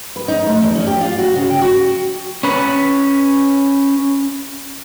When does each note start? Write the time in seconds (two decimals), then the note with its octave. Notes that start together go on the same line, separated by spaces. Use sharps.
0.16 B4
0.28 D#4
0.46 A3
0.62 E2
0.75 C#4
0.87 G4
1.01 F4
1.19 F#4
1.35 C#3
1.50 G5
1.62 F#4
2.43 C#4 B4